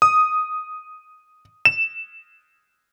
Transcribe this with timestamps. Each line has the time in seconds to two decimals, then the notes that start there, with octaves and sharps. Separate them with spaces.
0.02 D#6
1.65 E7